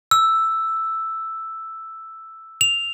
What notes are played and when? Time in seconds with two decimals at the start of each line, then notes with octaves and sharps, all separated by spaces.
0.11 E6
2.61 F7